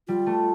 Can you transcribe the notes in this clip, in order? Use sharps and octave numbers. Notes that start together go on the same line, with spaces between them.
G3 F4
A3